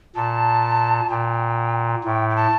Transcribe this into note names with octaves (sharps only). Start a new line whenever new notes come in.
A#2 A5
A#2 G5
A2 G5
G5
A5